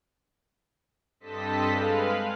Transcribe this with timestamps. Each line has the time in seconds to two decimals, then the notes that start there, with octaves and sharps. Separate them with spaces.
1.20 G2 C4 A4 D#5 A5 B6
1.68 G#3 B4 F5